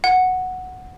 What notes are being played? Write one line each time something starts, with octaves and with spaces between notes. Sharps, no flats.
F#5